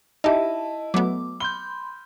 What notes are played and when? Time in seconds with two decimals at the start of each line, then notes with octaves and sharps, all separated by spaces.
0.24 D#4 E4 G4 D#5 A5
0.94 F#3 A3 B3 D6
1.40 B5 C6 G6 G7